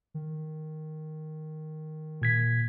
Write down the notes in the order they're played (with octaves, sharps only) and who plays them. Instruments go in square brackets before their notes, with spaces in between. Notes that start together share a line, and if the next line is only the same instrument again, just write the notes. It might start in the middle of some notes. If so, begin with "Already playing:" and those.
[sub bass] D#3
[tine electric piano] A#2 G#6 B6